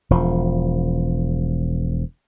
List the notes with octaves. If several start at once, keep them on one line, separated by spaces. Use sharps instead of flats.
E1 F3